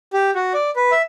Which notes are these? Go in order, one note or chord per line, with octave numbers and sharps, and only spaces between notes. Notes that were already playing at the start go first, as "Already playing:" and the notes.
G4
F#4
D5
B4
E5